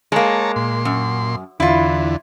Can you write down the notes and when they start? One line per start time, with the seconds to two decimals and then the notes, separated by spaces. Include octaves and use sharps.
0.12 G#3 A#3 C#5 A5 A#5
0.56 A#2 C6
0.85 F#2
1.60 E2 D3 E4 F4